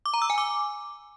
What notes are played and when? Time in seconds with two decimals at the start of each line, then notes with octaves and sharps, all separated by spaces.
0.06 D6
0.14 A#5
0.22 E6
0.30 G#5
0.38 D6